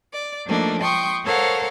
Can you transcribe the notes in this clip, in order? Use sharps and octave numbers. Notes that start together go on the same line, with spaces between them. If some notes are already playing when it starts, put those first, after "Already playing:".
D5
F3 A3 A#3 D4 D#4
G5 C6 C#6 D#6
A4 A#4 C5 C#5 F5 F#5